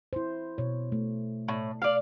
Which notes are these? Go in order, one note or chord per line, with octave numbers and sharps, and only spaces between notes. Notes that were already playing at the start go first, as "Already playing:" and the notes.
E4 C5
B2 C#5
A3
A2
D5 F5